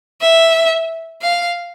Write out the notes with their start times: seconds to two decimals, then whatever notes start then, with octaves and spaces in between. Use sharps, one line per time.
0.21 E5
1.22 F5